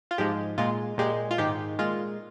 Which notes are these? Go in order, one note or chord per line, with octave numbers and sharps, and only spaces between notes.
F4
G#2 F3 G#3 G4
A#2 G#3 F4
A#2 G#3 G4
F4
G#2 D#3 G#3 G4
A#2 G#3 F4